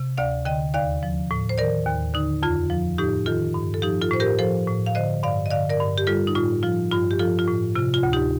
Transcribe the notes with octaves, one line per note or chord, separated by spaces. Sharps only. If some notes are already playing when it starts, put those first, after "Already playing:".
Already playing: C3
D2 D5 F5
D3 D#5 G5
D#2 D5 F5
F3
A2
C5
D#3 A#4 D5
D#2
D3 D#4
F2 F4
F3
A2 D#4 G4
D#3 F4 A4
G2
A4
F3 D#4 G4
F4 A4
A2 C5
G4 A#4
F3 A4 C5
A2
F5
D3 C5 D#5
G2 D5 F5
D#5
D3 D5 F5
A#4 D5
G2
G4
G3 F4 A4
D#4
A2 F4
F3 F4
G2 F4
G4
F3 F4 A4
F4
A2
C3 F4
F4
D2
D#4 G4